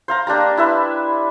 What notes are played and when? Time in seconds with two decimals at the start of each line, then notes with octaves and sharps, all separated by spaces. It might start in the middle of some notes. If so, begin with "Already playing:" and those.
0.08 C5 F5 A#5
0.27 A#3 D4 G4 A#5
0.57 E4 B4 E5